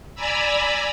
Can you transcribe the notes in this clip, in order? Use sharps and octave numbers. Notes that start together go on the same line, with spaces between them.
D5 G#5 A#5 B5 E6